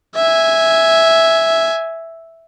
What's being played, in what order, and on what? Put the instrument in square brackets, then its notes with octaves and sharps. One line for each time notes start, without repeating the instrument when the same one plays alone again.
[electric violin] E5 G#5